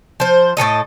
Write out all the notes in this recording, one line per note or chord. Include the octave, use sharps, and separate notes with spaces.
F3 C5
A2 E3 A4 D#5